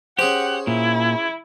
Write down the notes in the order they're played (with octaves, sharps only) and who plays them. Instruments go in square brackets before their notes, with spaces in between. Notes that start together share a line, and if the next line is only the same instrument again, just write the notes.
[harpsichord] C#4 G#4 C5 [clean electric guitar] G4 [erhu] F#5
[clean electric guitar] A#2 [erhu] E4